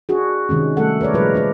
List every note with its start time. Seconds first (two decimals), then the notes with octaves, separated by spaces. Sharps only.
0.09 D4 F#4 G#4
0.49 C3 D#3 G#3 C#4
0.77 G3 A3 A4 F#5
1.01 A#4 B4 C#5 D5
1.14 A#2 F3 G3 G#3 A#4 B4
1.34 D4 B4 D5